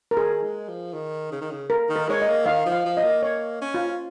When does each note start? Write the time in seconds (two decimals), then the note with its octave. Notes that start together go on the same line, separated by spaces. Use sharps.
0.11 A#4
0.16 D#3 G#4
0.42 G#3
0.68 F3
0.93 D#3
1.32 C#3
1.41 D#3
1.50 C#3
1.70 A#4
1.89 D#3
1.96 A#4
2.08 G#3 C#5
2.22 D#5
2.28 A#3
2.46 D#3 F5
2.66 F3
2.72 F5
2.85 F3
2.97 D#5
3.03 A#3
3.23 A#3 C#5
3.61 C#4
3.74 F4